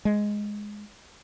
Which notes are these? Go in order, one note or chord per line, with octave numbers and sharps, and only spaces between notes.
G#3